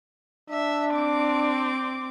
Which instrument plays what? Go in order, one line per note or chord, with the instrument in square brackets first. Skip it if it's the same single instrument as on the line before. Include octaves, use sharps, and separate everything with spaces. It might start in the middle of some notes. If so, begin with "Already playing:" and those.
[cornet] D4 [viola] E5
[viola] C4 D6